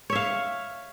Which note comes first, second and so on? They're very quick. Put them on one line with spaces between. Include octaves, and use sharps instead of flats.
C#5 E5 F5